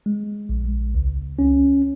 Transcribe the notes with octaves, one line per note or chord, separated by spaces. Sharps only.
G#3
A#1
C#2
C#4